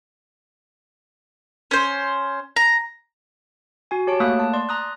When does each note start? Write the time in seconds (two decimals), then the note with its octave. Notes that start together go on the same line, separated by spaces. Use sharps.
1.71 C#4 C5
2.56 A#5
3.91 F#4 G#5
4.07 G4 C#5 A5 D7
4.20 A3 A#3 D#6 F#6
4.39 A5
4.53 D5 C6
4.69 A#5 D#6 F#6